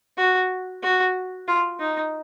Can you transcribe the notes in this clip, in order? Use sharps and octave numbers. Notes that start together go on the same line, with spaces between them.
F#4
F#4
F4
D#4